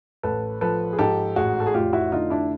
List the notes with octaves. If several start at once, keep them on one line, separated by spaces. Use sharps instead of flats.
A1 A4 B4
F3 A4 B4
G#4
G#2 G4 A4
A1 F#4 G#4
A4
G#4
F1 F4 G4
E4 F#4
D3 D#4 F4
D4 E4